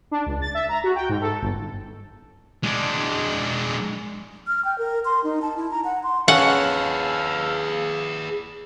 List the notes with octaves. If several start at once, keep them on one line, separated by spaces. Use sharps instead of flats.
D4
C#2
A6
E5
A#5
F#4
G5
G#2
A4
G1
G#3 D4
F6
G5
A#4
C6
D#4
A5
E4
A#5
F#5
C6
C#4 G#4 B4 F5 F#5 A5 E6